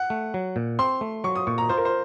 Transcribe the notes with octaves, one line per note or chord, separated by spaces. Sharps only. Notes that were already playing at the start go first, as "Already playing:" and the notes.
Already playing: F#5
A3
F#3
A#2
C4 C6
A3
F#3 C#6
D#6
A#2 C#6
A#5
F4 C5
A#4
C5